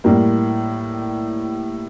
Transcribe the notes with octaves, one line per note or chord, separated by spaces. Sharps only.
A2 G3 A#3